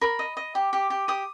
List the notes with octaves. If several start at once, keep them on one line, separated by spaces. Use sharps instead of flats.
A#4 B5
D#5
D#5
G4
G4
G4
G4 D#6